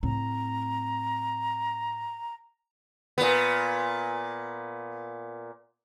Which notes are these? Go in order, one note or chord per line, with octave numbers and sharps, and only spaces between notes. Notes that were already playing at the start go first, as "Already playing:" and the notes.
A2 C4 A#5
A#2 B3